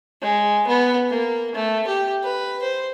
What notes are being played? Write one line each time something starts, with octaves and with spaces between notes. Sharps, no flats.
G#3
B3
A#3
A3
G4
B4
C5